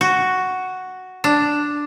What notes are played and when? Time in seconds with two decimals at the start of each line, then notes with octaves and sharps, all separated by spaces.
0.01 F#4
1.24 D4